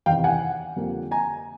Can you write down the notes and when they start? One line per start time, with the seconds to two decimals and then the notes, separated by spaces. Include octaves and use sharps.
0.06 E2 C3 D#3 F5 G5
0.24 F#5 G#5
0.76 F2 D3 G3 A#3
1.11 G#5 A#5